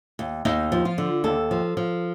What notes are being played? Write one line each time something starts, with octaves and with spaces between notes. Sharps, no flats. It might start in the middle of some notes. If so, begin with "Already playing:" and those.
D#2
D#2 D#4
F3
F4
D3
D#2 A4
F3
F3